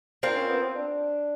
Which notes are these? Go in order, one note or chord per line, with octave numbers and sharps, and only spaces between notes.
C4 D4 F4 A#4
C#4
B3
C4
D4